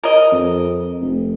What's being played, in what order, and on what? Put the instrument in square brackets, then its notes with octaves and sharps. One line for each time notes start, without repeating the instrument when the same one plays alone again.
[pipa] A#4 D#5
[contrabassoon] F2
F1